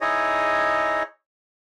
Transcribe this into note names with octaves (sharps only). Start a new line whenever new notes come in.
D#4 E4 G#4 C#5 D#5